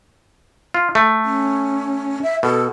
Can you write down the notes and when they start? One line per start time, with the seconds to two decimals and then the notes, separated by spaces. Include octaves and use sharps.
0.74 F4
0.95 A3
1.25 C#4
2.23 E5
2.43 B2 A4